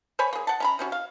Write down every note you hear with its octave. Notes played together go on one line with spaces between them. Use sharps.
C5 C#5 G#5 B5
A#3 G#4
F#5 A5
C#4 A#5 B5
C3 C#4 F#4
F5